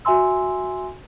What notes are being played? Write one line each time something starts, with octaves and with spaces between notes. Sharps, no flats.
F#4 E5 G#5 C6 E6